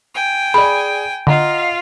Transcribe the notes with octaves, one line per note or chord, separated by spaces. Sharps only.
G5 G#5
G#4 D5 B5
D3 F4 D#5 F5 F#5 A#5